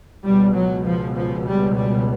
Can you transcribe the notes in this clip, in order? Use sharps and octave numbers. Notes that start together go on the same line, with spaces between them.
C#2 B2 G3
F#3
F3
F3
G3
G3